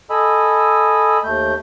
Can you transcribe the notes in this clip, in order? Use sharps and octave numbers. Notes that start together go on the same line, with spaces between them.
A4 D#5 G#5 B5 E6
D#2 A3 G6